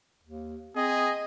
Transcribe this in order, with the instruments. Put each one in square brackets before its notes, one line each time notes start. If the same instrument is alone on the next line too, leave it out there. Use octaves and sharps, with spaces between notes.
[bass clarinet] D#2
[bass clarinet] C4 [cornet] G#4 [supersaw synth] D#5